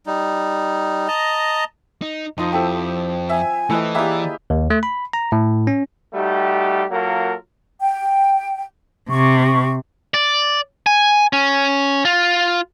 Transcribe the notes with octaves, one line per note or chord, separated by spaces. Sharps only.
G3 D#4
D#5 A5 A#5
D#4
F2 F3 D#4 C6 D#6
C4 E4 G4 A4
E5 G#5
E3 A3 E4 B4 D#5
A#3 G4 G#4 B4 D5 E5
D#2
A3
B5
A#5
A2
C#4
G3 A3 D#4 F#4 G4
F#3 A#3 F4 F#4 A4 A#4
G5
C3 C#6
D5
G#5
C#4
F4